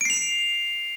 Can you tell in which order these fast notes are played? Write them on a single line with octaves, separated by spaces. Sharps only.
D7 C7 F7